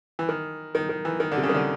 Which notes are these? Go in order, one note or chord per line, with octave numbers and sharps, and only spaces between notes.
E3
D#3
D#3
D#3
E3
D#3
D3
C3
C#3
D#3
D3